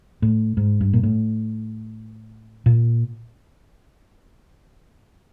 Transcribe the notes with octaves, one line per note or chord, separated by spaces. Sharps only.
A2
G#2
G2
A#2
A2
A#2